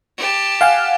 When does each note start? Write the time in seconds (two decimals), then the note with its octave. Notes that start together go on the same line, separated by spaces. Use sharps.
0.17 G4 A5
0.61 F5 F#5 G#5